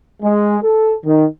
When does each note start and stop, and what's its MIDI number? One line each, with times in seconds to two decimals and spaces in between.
0.23 0.57 56
0.63 0.95 69
1.06 1.26 51